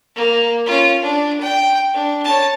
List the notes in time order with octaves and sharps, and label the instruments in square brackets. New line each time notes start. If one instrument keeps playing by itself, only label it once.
[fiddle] A#3
C#4 F4
D4
G5
D4
C#5 A5